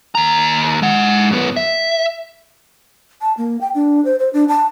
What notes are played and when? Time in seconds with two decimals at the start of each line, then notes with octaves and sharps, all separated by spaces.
0.15 D#2 A#5
0.82 G#3 F#5
1.31 F#2 B3
1.57 E5
3.21 A5
3.38 A#3
3.61 G5
3.75 D4
4.05 C5
4.19 C5
4.33 D4
4.48 A5